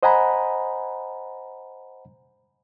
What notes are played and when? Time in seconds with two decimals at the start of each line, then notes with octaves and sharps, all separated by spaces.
0.03 C5 D#5 F#5 G#5 A#5 B5